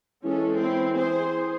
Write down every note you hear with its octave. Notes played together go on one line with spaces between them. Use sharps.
E3 G#3 C#4 A4
C4 E4
G#4 C5